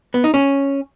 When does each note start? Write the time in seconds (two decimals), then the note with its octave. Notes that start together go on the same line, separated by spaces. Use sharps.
0.14 B3
0.24 D#4
0.34 C#4